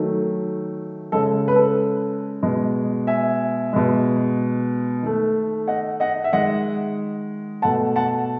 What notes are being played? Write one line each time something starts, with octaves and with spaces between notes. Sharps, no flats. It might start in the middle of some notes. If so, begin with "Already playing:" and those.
Already playing: D#3 F#3 A3
C#3 G#3 A4
B4
A4
B2 G#3
E5 G#5
B2 G#3
D#3 A3
D#5 F#5
D#5 F#5
E5
D#3 G#3 D#5 F#5
B2 A3 F#5 A5
F#5 A5